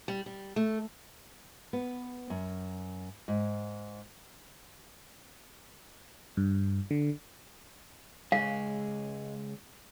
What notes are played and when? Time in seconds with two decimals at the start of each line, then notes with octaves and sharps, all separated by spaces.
0.08 G3
0.26 G3
0.56 A3
1.73 B3
2.30 F#2
3.28 G#2
6.37 G2
6.91 D3
8.32 C#2 G#3 G#4 F5